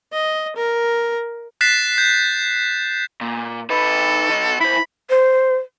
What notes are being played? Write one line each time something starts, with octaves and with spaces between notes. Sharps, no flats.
D#5
A#4
F#6 A6 B6 C7 E7
G6
A#2
D#4 A4 B4
F#3 D#5
E4 C5 B5
C5